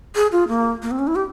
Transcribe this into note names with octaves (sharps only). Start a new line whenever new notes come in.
G#4
F4
A#3
A#3
C4
C#4
E4
G4